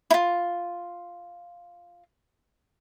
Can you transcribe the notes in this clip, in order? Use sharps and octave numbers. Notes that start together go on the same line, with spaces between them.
E4 F4